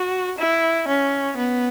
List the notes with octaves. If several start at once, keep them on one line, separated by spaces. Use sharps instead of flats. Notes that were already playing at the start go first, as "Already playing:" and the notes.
Already playing: F#4
E4
C#4
B3